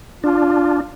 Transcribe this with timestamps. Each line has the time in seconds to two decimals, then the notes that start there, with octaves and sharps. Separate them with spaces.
0.24 D4 F4